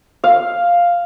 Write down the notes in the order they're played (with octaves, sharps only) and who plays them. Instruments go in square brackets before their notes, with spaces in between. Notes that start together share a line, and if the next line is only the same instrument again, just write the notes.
[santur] F5